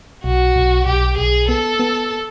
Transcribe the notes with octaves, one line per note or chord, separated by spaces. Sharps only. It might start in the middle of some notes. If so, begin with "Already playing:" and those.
B1 F#4
B1
B1 G4
B1 G#4
B3 A4
B3